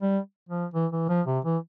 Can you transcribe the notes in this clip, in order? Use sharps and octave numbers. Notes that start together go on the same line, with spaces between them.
G3
F3
E3
E3
F3
C3
E3